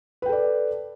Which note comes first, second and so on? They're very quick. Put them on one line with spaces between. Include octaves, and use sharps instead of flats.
B4 G5 A4 D5